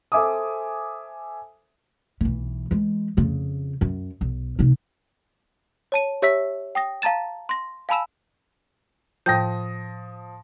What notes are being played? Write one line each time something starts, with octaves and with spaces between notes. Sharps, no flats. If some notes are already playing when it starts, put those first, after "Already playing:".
A4 C5 E5 G#5 D6 D#6
B1 E3
E3 G#3
F2 C#3
F#2
B1
C3 D#4
C#5 A5 D#7
G4 C#5 E5 E6 B6
G5 D#6 A#6
F5 A5 A#5 A6 E7
C6 A#6
F5 G#5 A5 B5 E6 E7
A2 F3 G5 D#6 G6 A#6